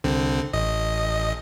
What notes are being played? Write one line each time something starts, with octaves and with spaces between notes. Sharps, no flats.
C2 D3 C4
A1 D#5